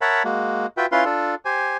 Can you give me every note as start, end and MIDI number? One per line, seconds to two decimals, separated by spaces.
0.01 0.23 70
0.01 0.23 73
0.01 0.23 76
0.01 0.23 78
0.01 0.23 81
0.01 0.23 83
0.25 0.66 56
0.25 0.66 58
0.25 0.66 66
0.77 0.86 65
0.77 0.86 66
0.77 0.86 71
0.77 0.86 76
0.77 0.86 79
0.92 1.05 61
0.92 1.05 64
0.92 1.05 65
0.92 1.05 71
0.92 1.05 77
0.92 1.05 84
1.05 1.35 62
1.05 1.35 65
1.05 1.35 69
1.45 1.77 67
1.45 1.77 72
1.45 1.77 80